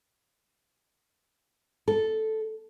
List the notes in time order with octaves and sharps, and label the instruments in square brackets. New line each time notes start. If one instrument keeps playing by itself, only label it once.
[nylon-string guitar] A4